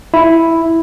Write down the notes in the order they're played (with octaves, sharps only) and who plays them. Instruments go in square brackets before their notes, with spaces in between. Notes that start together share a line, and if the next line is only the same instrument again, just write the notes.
[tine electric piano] E4